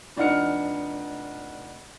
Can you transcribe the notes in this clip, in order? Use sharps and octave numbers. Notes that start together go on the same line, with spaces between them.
F1 D4 D#4 F#5 F6 C#7